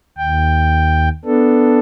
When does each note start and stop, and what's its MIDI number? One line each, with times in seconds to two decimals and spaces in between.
0.18 1.09 39
0.18 1.09 79
1.25 1.80 59
1.25 1.80 62
1.25 1.80 69